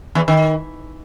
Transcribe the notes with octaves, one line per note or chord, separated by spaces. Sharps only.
E2 E3
D#3